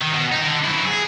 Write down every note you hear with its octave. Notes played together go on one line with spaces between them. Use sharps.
D#3
B2
D#4 A#4
D3
F#3 E4
G#4